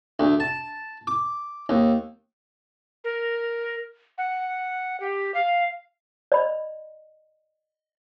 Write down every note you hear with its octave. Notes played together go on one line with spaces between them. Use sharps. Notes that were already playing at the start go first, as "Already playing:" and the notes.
D2
A5
D6
D#2
A#4
F#5
G4
F5
D5 D#5 B5